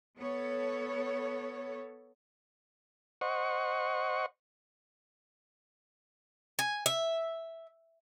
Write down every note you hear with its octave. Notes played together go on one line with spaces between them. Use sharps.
B3 A4 C#5
C5 D#5 F#5 C#6
G#5
E5